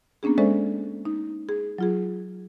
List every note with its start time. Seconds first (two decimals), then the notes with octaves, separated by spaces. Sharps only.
0.23 A#3 B3 C#4 D4 G#4
0.38 G#3 C#4 A4 C5 D5 E5
1.05 D#4
1.49 G#4
1.78 F#3 F4 G#4